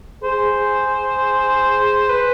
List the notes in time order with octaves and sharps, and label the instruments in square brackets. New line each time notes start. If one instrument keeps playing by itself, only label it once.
[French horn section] G#4 [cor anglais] C5
[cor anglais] B4